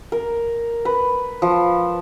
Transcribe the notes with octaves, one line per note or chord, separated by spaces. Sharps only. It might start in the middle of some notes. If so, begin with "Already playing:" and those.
A#4
B4
F3